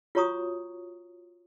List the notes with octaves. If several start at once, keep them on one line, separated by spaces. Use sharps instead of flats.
F4 F#4 C#5 A#5 C#6 D#6